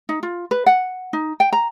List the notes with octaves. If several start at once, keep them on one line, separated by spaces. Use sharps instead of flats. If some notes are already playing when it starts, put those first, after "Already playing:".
D#4
F4
B4
F#5
D#4
G5
A#5